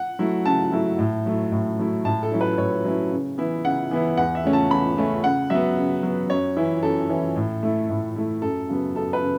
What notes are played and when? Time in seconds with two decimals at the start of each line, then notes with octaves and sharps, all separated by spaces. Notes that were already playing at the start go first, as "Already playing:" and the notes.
Already playing: F#5
0.19 F#3 A3 E4
0.46 C#3 A5
0.72 F#3 A3 E4
0.99 A2
1.26 F#3 A3 E4
1.52 A2
1.79 F#3 A3 E4
2.05 A2 A5
2.23 A4
2.32 F#3 C#4 E4
2.41 B4
2.58 A2 C#5
2.84 F#3 C#4 E4
3.12 C#3
3.38 E3 B3 E4
3.64 C#3 F#5
3.91 E3 B3 E4
4.17 E2 F#5
4.35 E5
4.44 C#3 A3 C#4
4.53 A5
4.70 E2 B5
4.97 C#3 A3 C#4
5.24 C#3 F#5
5.50 F#3 B3 E5
5.77 C#3
6.03 F#3 B3
6.30 F#2 C#5
6.56 E3 C#4 E4
6.82 F#2 A4
7.10 E3 C#4 E4
7.36 A2
7.63 A3 E4
7.90 A2
8.16 A3 E4
8.42 F#2 A4
8.69 C#3 F#3 B3
8.95 F#2 A4
9.13 B4
9.22 C#3